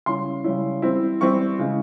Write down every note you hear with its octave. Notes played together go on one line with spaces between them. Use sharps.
C#3 G3 C#4 E4 C6
C#3 G3 C#4 E4
E3 G3 C4 E4
E3 G3 C4 E4 C#6
C#3 E3 G#3 E4